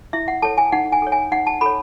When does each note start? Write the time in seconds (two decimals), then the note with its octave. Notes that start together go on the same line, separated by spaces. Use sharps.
0.13 E4 E5
0.28 F#5
0.42 A4 C#5 A5
0.58 G#5
0.72 D#4 F#5
0.92 G#5
1.02 A4 C#5
1.12 G#5
1.32 D#4 F#5
1.47 A5
1.61 A4 C#5 B5